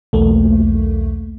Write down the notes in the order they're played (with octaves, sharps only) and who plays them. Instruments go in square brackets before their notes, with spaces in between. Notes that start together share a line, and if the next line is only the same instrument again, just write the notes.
[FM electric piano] B1 E2 A3 A#3